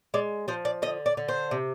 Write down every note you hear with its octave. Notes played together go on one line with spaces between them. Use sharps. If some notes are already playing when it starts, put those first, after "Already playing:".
G#3 D5
F3 C5
D5
D3 D#5
D5
D3
C5
C3